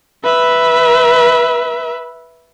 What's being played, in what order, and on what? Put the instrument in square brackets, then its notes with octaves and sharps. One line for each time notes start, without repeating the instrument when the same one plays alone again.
[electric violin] B4 E5